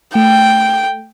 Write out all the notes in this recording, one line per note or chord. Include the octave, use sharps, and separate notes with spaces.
A3 G5